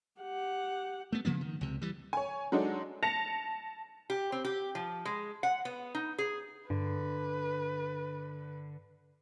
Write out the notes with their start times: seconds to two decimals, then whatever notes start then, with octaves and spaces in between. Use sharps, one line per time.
0.22 G4 F#5
1.12 A3 B3
1.25 C#3 F3 A#3 B3
1.41 D#3
1.61 C#2 C3
1.82 E3 G3
2.13 C#5 G#5
2.52 F#3 G#3 D4 D#4 A4
3.03 A5 A#6 C#7 F7
4.10 G4
4.32 C4
4.45 G4
4.75 F3
5.05 G#3
5.43 F#5
5.65 B3
5.95 D#4
6.18 G#4
6.70 G2 D3 B4